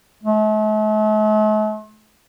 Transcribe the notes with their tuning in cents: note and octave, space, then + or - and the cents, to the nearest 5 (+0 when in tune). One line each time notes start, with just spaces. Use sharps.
A3 -45